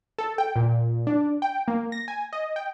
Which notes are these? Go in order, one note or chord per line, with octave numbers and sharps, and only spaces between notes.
A4
G5
A#2
D4
G5
A#3
A#6
G#5
D#5
G5